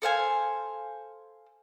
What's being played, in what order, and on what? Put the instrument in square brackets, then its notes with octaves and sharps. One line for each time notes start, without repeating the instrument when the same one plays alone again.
[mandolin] A4 C5 F5 G#5